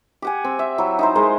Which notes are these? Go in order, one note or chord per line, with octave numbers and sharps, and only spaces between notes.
G4 F#5 G#5
C4
E5
F#3 E4
D#4 E4 C5
G#3 A#4 C5